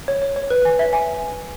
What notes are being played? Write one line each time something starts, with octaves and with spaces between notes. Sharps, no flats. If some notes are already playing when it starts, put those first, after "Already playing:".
C#5
C#5
C#5
B4
G#5
E5
G#5